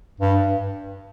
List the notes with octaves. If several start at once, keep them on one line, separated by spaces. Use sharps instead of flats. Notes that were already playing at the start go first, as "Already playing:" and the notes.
G2